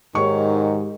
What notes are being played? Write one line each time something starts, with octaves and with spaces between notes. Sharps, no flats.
G#2 D#3 G4 C#5 C#6